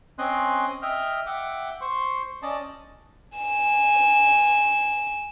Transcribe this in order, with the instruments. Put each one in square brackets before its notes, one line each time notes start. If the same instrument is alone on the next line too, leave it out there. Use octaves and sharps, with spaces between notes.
[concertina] C4 C#4 D#5 G#5 C6 F#6
D#5 E5 G5 F6
E5 F#5 G5 D6
C5 C6 C#6
C#4 D5 D#5 A5
[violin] G#5 E7